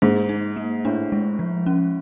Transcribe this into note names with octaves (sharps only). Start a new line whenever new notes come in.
G#2 A#3
D#4
A#3
A2 D4
G#3
F3
C#4